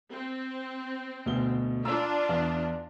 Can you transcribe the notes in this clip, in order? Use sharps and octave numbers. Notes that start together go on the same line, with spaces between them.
C4
D2 B2 G7
D4 F4 A#5 E6
E2